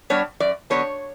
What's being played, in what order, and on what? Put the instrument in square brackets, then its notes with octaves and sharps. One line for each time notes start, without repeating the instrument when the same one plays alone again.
[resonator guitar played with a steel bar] G3 B3 D4 C#5
F#2 D5
D3 F#3 B3 D4 C#5